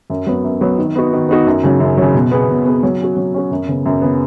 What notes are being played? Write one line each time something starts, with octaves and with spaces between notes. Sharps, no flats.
F#2
F#3 B3
F#2
F#3 B3
D#3
B3 D#4 F#4
D#3
B3 D#4 F#4
F#2
C#3 F#3
F#2
C#3 F#3
B2
B3 G#4
B2
B3 G#4
F#3
C#4 F#4
F#3
C#4 F#4
F#2
C#3 B3
F#2
C#3 B3